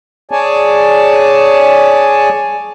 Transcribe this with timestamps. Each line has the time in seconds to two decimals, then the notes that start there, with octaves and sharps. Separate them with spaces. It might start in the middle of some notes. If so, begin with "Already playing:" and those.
0.31 G#4 C#5 D5 G#5 A5